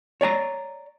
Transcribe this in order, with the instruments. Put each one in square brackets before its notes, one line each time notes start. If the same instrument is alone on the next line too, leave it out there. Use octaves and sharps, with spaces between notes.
[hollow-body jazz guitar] C#5 D5 G#5 A#5